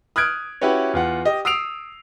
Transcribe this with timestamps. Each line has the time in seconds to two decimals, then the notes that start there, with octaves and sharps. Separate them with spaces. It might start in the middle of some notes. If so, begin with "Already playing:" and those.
0.16 D#6 F6 F#6 G#6 D7
0.61 C#4 E4 F#4 G4 B4 C#5
0.93 E2 F4 F#5
1.25 G4 D#5
1.45 D#6 E6 C7 D7 F7